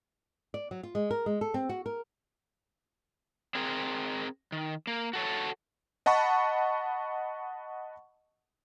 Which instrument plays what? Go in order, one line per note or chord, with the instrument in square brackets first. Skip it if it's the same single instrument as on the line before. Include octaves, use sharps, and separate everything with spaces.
[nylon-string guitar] D5
F#3
F4
G#3
A#4
G#3
A4
C4
F#4
A#4
[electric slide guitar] C4 G#4 A#4
D#3
A#3
F#4 A4 C#5
[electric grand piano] D#5 F#5 A5 B5 C#6